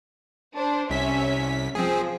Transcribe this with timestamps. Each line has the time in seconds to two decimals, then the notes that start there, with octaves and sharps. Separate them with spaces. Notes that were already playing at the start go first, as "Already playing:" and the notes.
0.56 D4 C5
0.90 C2 C#4 E5 B6
1.75 F3 C4 G#4